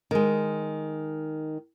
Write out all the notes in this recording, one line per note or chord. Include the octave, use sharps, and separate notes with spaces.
D#3 G#3